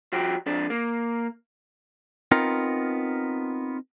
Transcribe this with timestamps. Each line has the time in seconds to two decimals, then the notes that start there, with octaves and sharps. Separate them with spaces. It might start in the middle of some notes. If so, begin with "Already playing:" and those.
0.12 F3 F#4 G4
0.46 F2 D4 A4
0.70 A#3
2.31 B3 C4 D#4 F4 A#4